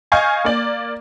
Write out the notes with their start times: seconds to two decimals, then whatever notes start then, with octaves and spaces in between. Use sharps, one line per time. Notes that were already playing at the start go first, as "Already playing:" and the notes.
0.12 D#5 F5 G#5 C#6 G6
0.45 A#3 D5